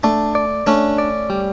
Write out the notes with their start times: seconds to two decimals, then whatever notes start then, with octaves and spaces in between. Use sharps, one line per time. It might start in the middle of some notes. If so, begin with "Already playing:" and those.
0.03 A3 D4
0.35 D5
0.67 A3 C#4 D4
0.98 D5
1.30 G3